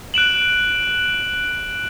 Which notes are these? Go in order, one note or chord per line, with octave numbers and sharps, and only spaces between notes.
F#6 D7 E7 F#7